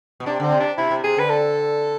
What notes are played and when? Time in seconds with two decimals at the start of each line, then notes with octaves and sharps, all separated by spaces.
0.20 B2
0.26 C3 D4
0.40 D3 C4
0.52 C3
0.60 D4
0.78 C3 E4
0.91 C3
1.04 C3 G#4
1.17 D3 B4
1.30 A4